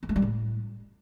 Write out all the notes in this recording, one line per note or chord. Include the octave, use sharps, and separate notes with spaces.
B3
A3
G3
A2